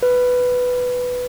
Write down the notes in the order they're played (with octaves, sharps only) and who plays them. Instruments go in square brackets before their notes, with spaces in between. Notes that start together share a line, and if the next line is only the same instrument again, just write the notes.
[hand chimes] B4